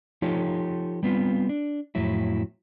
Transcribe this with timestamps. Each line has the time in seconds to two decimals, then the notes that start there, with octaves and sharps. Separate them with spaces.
0.22 F3 D#4 F4 G4 A4 C#5
1.03 G3 B3 C4 F4
1.49 D4
1.95 F2 A2 F#3 E4